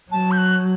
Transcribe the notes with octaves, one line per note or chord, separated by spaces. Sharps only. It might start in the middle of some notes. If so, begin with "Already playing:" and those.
F#3 A5
G6
F#6